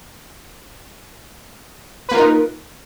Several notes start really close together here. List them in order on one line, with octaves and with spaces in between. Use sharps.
B4 A#3 F4 A#4 D#4